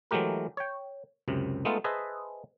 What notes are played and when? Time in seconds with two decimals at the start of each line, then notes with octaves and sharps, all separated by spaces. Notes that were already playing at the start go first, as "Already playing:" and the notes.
0.11 E3 F#3 G#3 A3 G4 A#4
0.57 C#5 G5
1.28 C#2 F#2 C3
1.65 G#3 A3 B3 D#4 F4 A4
1.84 G#4 B4 C5 D#5 E5 A5